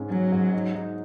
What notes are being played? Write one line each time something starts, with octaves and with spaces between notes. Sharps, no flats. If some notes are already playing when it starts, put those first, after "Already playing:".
Already playing: G#2 C#4 D#4
F#3 C#4
G#2
D#4
D#4